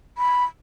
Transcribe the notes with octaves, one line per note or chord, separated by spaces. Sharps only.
B5